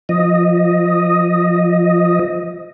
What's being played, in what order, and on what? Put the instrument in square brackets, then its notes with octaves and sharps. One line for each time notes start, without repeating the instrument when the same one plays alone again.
[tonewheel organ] F3 D#5